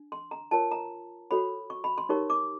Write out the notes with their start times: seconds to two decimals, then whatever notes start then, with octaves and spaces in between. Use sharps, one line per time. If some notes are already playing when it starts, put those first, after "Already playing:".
Already playing: D4
0.12 C6
0.31 A#5
0.51 F4 A#4 C#5 A5
0.71 A#5
1.31 F#4 A4 C#5 B5
1.70 C#6
1.84 B5
1.98 C6
2.09 D#4 G4 A#4 C#5 C#6
2.30 D6